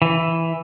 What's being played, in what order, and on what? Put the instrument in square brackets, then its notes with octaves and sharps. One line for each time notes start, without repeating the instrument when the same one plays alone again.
[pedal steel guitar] E3